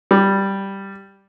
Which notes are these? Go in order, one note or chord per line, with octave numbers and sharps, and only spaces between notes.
G3